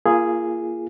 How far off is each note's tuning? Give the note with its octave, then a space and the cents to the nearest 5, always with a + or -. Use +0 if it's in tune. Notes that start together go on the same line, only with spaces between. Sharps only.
A#3 +0 F4 -30 G#4 +0